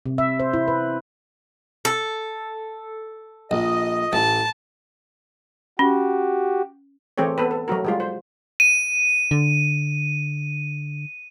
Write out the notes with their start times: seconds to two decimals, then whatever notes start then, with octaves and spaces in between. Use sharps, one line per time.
0.06 C3
0.18 E5
0.40 C5
0.54 E4
0.68 B4
1.85 A4
3.51 A#1 D#5
4.13 A1 A5
5.79 C#4 F#4 G4
7.18 E3 A3 C4 G4 G#4 C#5
7.38 B3 A4 B4
7.51 A4
7.68 F#3 A3 F#4 A#4
7.85 G3 G#3 F4
8.00 C5
8.60 D#7
9.31 D3